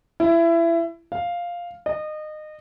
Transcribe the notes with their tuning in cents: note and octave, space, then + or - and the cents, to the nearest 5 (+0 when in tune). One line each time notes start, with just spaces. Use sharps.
E4 +25
F5 +0
D#5 -25